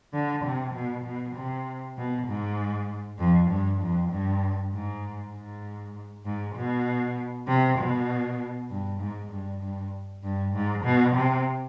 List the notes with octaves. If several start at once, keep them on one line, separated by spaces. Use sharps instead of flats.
D3
C3
B2
B2
C3
B2
G#2
F2
G2
F2
G2
G#2
G#2
G#2
B2
C3
B2
G2
G#2
G2
G2
G2
G#2
B2
C3